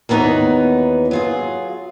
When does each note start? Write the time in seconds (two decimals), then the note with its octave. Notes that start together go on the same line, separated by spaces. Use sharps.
0.09 D#2 E3 B3 D#4 B4 C#5
1.11 F#3 F4 G#4